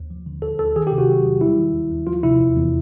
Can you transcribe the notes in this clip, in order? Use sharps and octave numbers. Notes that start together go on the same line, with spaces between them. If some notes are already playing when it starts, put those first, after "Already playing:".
Already playing: D#2
F3
D3
D2 A4
D2 A4
D#3 G#4
G4
C3
F#4
F#3
E2
G3 E4
D#3
D#2
D#2
F3 F4
C3 E4
E2
E2